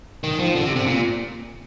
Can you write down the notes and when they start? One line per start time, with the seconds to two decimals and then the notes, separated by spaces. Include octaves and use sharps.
0.24 D#3
0.39 F3
0.55 D3
0.66 C3
0.76 C3
0.86 A#2